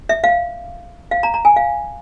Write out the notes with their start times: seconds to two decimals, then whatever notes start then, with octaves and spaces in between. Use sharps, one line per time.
0.09 E5
0.24 F5
1.11 F5
1.23 A#5
1.34 A#5
1.45 G#5
1.56 F5